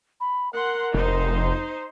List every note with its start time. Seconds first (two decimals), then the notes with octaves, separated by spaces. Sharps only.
0.20 B5
0.53 A#4 F#5 C6
0.94 F1 D#4 C5